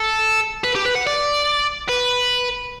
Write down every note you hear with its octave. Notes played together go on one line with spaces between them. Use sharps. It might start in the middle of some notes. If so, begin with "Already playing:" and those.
Already playing: A4
B4
G4
B4
F#5
D5
B4